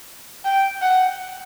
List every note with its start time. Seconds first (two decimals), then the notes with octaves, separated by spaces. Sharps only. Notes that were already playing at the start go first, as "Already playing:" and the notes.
0.44 G5
0.82 F#5